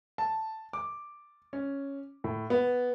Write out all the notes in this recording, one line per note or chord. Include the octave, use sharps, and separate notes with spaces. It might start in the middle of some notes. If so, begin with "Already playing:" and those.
A5
D6
C#4
A2
B3